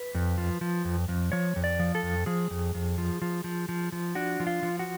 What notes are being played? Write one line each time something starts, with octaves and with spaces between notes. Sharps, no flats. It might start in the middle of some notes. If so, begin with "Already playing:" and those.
Already playing: B4
F2
F3
F3
F2
F2
F3 C#5
F2
D5
F3
A4
F2
F3 G#4
F2
F2
F3
F3
F3
F3
F3
D4 F#4
F3
F4
F3
F#4